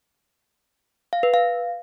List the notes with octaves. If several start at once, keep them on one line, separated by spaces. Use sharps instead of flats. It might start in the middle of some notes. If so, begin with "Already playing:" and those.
F5
B4
F5